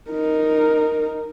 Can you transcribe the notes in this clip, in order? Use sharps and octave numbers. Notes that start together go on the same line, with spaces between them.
D#4 A#4